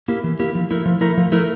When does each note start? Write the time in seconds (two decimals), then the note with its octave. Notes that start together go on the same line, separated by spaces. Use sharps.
0.08 A#3 E4 G4 A#4
0.24 E3
0.40 A#3 E4 G4 A#4
0.55 F3
0.71 A3 E4 A#4
0.86 F3
1.01 A3 E4 A#4
1.17 F3
1.32 A3 E4 A#4